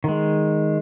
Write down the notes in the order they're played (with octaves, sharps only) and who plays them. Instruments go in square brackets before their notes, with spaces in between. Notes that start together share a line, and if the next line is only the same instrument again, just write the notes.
[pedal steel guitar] D#3 G#3